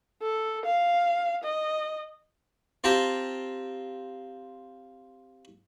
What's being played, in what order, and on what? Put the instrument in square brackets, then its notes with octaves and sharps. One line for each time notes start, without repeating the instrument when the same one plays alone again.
[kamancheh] A4
F5
D#5
[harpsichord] C4 F4 G4 A5 A#5